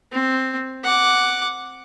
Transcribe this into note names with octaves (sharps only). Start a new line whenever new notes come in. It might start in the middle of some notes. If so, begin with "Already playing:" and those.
C4
F#5 D6